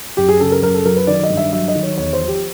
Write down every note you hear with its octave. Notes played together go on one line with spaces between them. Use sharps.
F#2 G4
G#4
C#3 A4
A#4
F#2 A#4
A4
F#3 A#4
B4
D#3 D5
D#5
G2
E5
F#3 E5
D#5
D#3
C#5
E2 C#5
C5
F3
G4